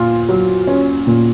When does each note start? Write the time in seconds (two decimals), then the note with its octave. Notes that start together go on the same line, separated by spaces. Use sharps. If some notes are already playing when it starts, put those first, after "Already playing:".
Already playing: A#2 F4
0.29 F#3
0.67 C#4
1.07 A#2